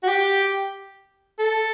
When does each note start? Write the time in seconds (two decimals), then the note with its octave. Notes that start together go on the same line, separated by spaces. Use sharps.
0.03 F#4
0.08 G4
1.39 A4